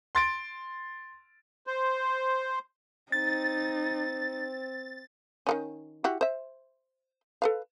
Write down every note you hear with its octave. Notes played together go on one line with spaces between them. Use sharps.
C6 A6 D7
C5
C4 D#4 A6
D#3 E3 C#4
E4 F#4 G4
C5 E5
A4 B4 F5